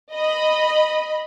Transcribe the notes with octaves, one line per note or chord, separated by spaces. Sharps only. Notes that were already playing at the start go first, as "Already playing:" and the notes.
D#5 B5